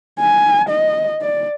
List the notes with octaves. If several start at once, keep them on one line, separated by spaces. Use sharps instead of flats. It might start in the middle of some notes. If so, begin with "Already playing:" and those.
G#5
D#5
D5